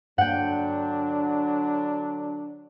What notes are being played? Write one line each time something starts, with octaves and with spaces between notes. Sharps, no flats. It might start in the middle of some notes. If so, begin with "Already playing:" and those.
G2 D3 F#3 A#3 D4 F#5 G5